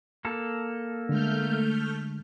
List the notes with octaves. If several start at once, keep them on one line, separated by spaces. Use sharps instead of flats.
A#3 A4
D3 G#3 A3 F6 G6